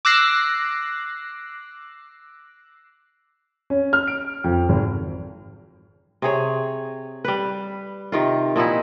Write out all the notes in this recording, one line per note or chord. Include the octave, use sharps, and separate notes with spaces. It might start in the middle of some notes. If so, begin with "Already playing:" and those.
D6 E6 F#6 A#6 C7
C#4
F6
D7
F2
G#1
C3 G#4 C#5
G3 B4
C3 D#3 F4
A#2 F3 D#4 E4